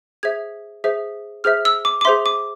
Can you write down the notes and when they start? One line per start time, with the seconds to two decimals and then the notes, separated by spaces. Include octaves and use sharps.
0.23 G#4 C5 E5 G#6
0.84 G#4 C5 E5
1.44 G#4 C5 E5 F6
1.65 E6
1.85 D6
2.01 D6
2.05 G#4 C5 E5 C6
2.26 D6